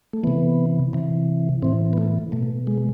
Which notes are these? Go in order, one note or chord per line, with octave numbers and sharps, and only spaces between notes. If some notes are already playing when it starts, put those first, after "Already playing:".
A3
C3 E3 B3
C3 E3
A2 E3 C4
B3
A3
B2 A3
G#3